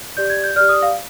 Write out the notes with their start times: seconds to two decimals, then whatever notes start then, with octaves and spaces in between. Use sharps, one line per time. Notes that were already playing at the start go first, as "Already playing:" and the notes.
0.17 G4 D5 G6
0.30 G#6
0.44 G6
0.56 G4 D5 F6
0.69 D#6
0.82 F5